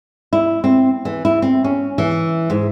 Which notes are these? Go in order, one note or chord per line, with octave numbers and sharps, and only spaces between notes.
E4
C4
E3
E4
C4
C#4
E3
G#2